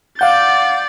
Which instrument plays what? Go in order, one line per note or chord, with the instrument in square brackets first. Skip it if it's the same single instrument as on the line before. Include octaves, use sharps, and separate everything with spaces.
[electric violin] D5 A6 [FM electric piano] F5 F#5 G6